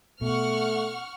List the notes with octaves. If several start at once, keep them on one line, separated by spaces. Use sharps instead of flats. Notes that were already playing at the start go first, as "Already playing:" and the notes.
B2 A3 F#5 C#6 F6